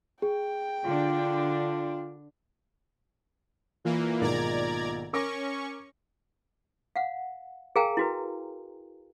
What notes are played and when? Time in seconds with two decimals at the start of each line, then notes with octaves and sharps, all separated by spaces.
0.22 G#4 G5
0.85 D3 D4 F4
3.85 A#2 E3 A#3
4.21 B1 G#2 D#3 D5 A#5 G#6
5.13 C#4 A#4 C#6 D6 A#6
6.96 F5 F#5
7.76 G#4 A#4 F5 G5 G#5 A#5
7.97 E4 F#4 B4